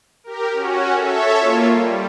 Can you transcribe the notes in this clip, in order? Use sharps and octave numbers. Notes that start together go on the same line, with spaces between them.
G4 A#4
C#4 F#4
A4 C#5 E5
A#3 F4
G3